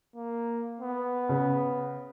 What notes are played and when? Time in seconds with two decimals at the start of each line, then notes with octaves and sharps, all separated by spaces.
0.16 A#3
0.80 B3
1.29 C#3